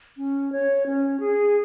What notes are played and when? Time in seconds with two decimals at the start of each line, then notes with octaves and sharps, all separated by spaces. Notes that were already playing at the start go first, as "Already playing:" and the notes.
0.17 C#4
0.52 C#5
0.86 C#4
1.20 G#4